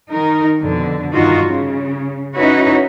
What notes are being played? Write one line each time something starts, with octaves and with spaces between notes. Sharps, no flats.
D#3 D#4 A#4
F2 B2 D3
G2 D#3 D#4 F4 F#4
C#3
C#4 D#4 E4 F#4 B4 C#5